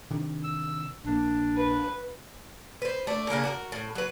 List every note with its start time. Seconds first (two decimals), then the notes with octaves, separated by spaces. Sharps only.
0.11 C3 D#3 D4
0.44 E6
1.04 A#1 A#3 D4
1.57 B4
2.82 B4 C5
3.07 A3 D4
3.29 C#3 A#3 D4 A#4
3.44 D4 F#4 A#4
3.72 A2
3.95 F#3 B4